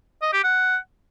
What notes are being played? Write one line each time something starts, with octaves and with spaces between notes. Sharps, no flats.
D#5
G4
F#5